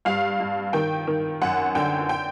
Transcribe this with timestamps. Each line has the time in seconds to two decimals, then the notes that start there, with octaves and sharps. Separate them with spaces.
0.05 G2 F5
0.40 G2
0.73 D#3 G5
1.07 D#3
1.42 F#2 F#5
1.75 D3 G5
2.09 G5